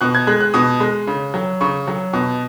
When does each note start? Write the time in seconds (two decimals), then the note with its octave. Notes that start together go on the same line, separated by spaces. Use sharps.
0.01 B2 F#6
0.15 G#6
0.27 G#3 F#6
0.41 F#6
0.54 B2 D#6
0.80 G#3
1.07 C#3
1.34 F#3
1.61 C#3 C#6
1.88 F#3
2.13 B2